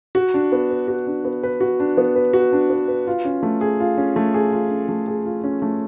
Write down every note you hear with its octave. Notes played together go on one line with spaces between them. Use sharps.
F#4
D4
B3
B4
F#4
D4
B3
B4
F#4
D4
B3
B4
F#4
D4
B3
B4
F4
C#4
A3
G#4
F4
C#4
A3
G#4
F4
C#4
A3
G#4
F4
C#4
A3